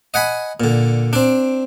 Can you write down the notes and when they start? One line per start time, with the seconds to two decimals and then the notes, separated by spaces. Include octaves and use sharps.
0.14 D#5 F#5 G#5 B5
0.60 A#2 D3
1.13 C4 D4